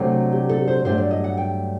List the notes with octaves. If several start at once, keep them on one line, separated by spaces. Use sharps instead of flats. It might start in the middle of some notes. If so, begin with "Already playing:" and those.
Already playing: C3 F#3 A3 D4
G4
A4
C5
G2 F#3 A3 D4 C5
D5
D#5
F#5
G5